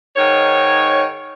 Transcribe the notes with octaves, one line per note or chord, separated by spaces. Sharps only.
G#2 D#3 C#5